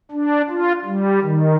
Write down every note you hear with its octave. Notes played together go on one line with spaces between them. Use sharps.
D4
F4
G3
D#3